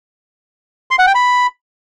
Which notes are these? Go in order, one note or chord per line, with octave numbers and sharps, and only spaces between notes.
C6
F#5
G5
B5